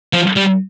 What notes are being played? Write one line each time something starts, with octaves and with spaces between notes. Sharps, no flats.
F3
G3